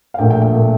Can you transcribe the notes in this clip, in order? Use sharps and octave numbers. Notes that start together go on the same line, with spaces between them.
F5
A#1 A#2 A3 G5
G5
G5
A#2 A3